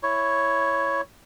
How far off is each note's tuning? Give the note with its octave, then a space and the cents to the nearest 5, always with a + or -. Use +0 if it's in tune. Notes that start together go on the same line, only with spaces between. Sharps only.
E4 +0 C#5 +0